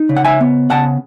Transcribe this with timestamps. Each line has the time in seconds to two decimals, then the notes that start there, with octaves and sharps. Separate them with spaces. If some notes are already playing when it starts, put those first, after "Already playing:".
Already playing: D#4
0.09 C#3
0.16 F#5
0.25 E5 G#5
0.41 B3
0.70 C#3 F#5 A5